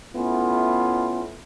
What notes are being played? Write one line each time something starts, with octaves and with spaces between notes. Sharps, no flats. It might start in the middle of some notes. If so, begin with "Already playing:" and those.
A3 B3 C#4 E4 F4